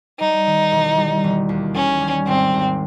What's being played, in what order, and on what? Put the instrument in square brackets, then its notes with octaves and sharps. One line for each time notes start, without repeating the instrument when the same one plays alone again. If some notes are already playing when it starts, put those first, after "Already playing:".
[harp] G3 [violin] D#4
[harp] D#3
E1
G3
E1
D#2
[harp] D#3 [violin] C#4
[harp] G3
[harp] G#1 [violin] C4
[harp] G#1